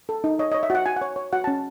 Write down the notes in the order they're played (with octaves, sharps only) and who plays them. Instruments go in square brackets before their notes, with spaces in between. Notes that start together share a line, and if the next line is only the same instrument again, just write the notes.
[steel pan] A4
D#4
C#5 D#5
D#5
C#5
E5
F#4 F#5
F#4 G#5
F#5
C#5
C#5
F#4 F#5
A5
C#4